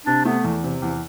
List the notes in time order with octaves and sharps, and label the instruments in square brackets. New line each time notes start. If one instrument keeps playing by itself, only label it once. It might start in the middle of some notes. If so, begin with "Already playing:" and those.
[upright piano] C3 [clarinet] D4
[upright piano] A3 [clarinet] B3
[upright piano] E2
C3
E2